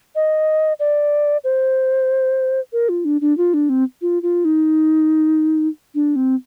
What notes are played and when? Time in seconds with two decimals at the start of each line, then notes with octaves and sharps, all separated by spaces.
0.15 D#5
0.80 D5
1.44 C5
2.73 A#4
2.89 F4
3.05 D4
3.21 D4
3.38 F4
3.54 D4
3.69 C4
4.02 F4
4.23 F4
4.45 D#4
5.95 D4
6.16 C4